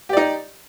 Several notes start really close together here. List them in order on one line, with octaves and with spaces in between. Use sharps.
G4 D5 D#4